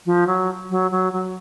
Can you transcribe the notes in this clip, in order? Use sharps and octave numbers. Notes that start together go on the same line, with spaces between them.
F3
F#3
F#3
F#3
F#3